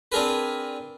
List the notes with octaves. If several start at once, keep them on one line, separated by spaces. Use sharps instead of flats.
C4 D4 G#4 A#4 B4